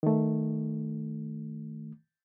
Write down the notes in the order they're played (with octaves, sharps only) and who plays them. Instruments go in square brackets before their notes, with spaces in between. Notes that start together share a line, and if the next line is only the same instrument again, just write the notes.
[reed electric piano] D#3 A3